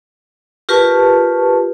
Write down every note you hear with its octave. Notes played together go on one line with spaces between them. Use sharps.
F4 G4 A#4 B4 A5 C#6